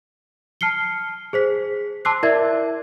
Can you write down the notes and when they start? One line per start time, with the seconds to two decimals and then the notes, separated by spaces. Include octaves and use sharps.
0.61 A5 F6 C7 C#7 G7
1.33 G#4 C5 B6
2.05 A5 C6 D6 E6 F#6 C7
2.23 E4 A#4 D5 E5 G#6